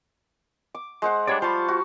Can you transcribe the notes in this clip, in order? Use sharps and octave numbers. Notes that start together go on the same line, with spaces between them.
D6
G#3 C5 F#5
G3 D4 G4 C#5 D5
F4 C5 A5 B5 C#6
F#4